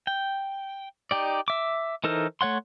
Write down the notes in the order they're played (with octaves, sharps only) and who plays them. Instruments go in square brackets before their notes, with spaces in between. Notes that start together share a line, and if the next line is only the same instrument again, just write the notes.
[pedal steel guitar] G5
D#4 G4 D5
E5 D6
E3 D#4 A4 A#4 C5
A3 C#5 F#5 C6